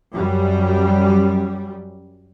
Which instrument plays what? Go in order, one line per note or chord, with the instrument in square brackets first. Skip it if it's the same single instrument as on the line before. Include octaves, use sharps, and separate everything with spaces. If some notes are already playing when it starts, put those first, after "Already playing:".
[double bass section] F#2 G3